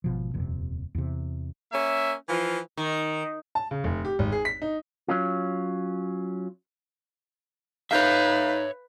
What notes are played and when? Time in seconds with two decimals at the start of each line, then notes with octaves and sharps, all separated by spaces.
0.04 G#1 B2 F3
0.34 D#1 F2 C3
0.95 E2 C3
1.72 A#3 C#4 E5
2.29 E3 F3 F4
2.77 D#3
3.55 A5
3.71 C#3
3.84 F1
4.05 G4
4.19 G#1
4.32 G#4
4.45 B6
4.62 D#4
5.08 F#3 C#4 F4
7.91 D#4 B4 C#5 E5 F5 G6